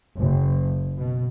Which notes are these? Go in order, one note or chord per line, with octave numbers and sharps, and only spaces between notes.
F#1
B2